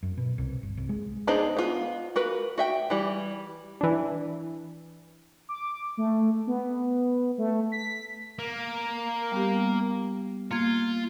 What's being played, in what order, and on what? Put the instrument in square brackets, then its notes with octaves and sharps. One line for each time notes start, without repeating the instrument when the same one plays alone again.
[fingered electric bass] F#2
B2
C2
G1
C2
G#3
[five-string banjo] B3 D4 D#4 G#4 C5
B3 F4
F#4 A#4 B4
F#4 E5 G5
E3 G3
[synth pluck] E3 D4
[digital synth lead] D6
A3
B3
A3
B6
[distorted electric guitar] A#3
[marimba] G3 B3 G4
[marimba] A#3 G#6 [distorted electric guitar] F4